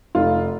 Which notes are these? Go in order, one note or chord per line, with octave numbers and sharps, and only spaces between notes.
F1 F4